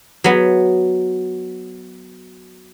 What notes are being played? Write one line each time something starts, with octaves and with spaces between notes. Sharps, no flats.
F#3 B3